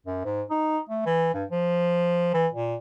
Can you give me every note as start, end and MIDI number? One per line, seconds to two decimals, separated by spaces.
0.06 0.20 42
0.25 0.42 44
0.50 0.80 63
0.89 1.05 57
1.06 1.32 52
1.34 1.45 43
1.51 2.29 53
2.34 2.47 52
2.54 2.76 46